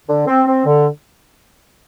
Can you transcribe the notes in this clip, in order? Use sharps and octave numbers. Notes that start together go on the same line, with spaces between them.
D3
C4
C4
D3